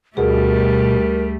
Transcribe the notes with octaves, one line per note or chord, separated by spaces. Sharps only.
D2 B2 G3 A3 G#4 A#4